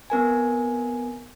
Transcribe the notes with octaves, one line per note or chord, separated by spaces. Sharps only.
B3 C4 A#4 G#5